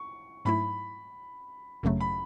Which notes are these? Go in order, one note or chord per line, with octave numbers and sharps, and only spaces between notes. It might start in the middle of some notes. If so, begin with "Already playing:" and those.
Already playing: C#6
G#2 F#3 A3 E4 B5
G#1 F#2 C#3 F#3 A3
B5